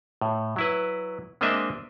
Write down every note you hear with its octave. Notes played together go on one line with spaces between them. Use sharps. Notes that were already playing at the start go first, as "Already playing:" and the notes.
A2
F#3 E4 B4
G#3 A#3 C4 D4 D#5 E5